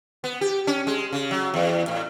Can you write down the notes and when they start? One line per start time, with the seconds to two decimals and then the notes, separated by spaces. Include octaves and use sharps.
0.24 B3
0.41 G4
0.67 C#4
0.87 G#3
1.13 C#3
1.31 F#3
1.54 E2
1.88 A2